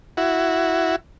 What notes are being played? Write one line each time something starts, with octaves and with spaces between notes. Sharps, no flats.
E4 F#4